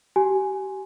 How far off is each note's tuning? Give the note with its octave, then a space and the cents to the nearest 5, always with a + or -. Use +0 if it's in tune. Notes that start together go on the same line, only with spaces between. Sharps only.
G4 -30 G#5 +0